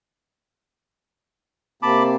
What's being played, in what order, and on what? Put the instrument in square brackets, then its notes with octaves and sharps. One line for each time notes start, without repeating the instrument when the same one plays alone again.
[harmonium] C3 A#3 C4 [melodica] A5 B5 D6